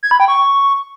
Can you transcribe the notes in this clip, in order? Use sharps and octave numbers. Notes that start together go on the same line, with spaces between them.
G#6
B5
G5
C#6